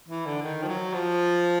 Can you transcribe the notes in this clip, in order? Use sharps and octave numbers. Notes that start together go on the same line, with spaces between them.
E3
D3
D#3
F3
F#3
F3